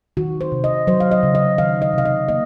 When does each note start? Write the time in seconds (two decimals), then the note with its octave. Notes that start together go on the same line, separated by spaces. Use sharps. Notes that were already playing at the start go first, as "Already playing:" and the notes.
0.17 D#3 F#4
0.41 C5
0.52 C3
0.64 D#5
0.87 F#3 C5
1.00 F5
1.11 D#5
1.23 C#3
1.35 D#5
1.58 D#3 F5
1.82 D#5
1.94 C3 F5
2.05 D#5
2.29 A#3 D#5